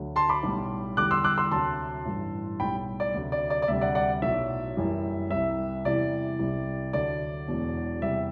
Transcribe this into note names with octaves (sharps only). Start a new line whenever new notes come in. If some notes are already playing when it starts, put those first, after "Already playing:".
Already playing: D2 D3 F#3
A5 C6
B5 D6
B1 A2 G3
E2 D3 G3 D6 F#6
C6 E6
D6 F#6
C6 E6
D2 C3 F#3 A5 C6
A1 G2 E3 G3
B1 A2 G3 G5 B5
D5
D2 C3 F#3
D5
D5
D5
D2 C3 G3 E5
D5 F#5
D5 F#5
B1 A2 F#3 E5
F#1 F#2 E3 G3
C2 C3 G3 E5
E2 C3 E3 G3 D5
C2 C3 G3
D2 D3 F#3 D5
E1 E2 B2 F#3
E2 C3 G3 E5